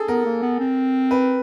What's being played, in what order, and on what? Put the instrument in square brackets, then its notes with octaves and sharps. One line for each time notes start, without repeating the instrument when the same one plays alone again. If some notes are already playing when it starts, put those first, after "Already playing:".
Already playing: [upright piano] G#4 A4
[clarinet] B3 [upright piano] A#4
[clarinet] A#3
B3
C4
[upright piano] B4